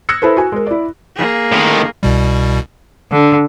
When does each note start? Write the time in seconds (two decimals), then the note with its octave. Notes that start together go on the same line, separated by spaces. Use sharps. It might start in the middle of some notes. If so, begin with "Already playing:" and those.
0.09 D#6 E6 F#6 G#6 A#6 C#7
0.22 E4 A4 B4 C5
0.37 F#4 G#5
0.52 G#3 A#4
0.66 E4 D5
1.16 A#3 G#4
1.52 A2 D#3
2.03 C2 B2 G3
3.11 D3